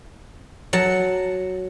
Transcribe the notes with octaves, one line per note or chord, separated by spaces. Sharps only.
F#3 F#5 A5